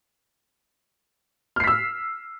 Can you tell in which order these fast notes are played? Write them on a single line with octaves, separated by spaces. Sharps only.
F6 C7 B6 E6